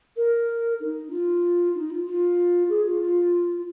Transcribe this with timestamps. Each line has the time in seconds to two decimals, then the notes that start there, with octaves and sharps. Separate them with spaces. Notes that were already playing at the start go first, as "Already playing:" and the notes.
0.17 A#4
0.80 D#4
1.11 F4
1.75 D#4
1.90 F4
2.06 F4
2.69 G#4
2.86 F4
3.01 F4